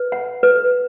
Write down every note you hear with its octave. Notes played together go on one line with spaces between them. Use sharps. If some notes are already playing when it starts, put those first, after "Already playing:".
Already playing: B4
F#5
B4